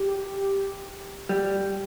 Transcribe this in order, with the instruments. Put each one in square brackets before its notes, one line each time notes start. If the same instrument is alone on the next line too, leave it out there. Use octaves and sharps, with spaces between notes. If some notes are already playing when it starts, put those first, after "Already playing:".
Already playing: [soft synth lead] G4
[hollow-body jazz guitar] G3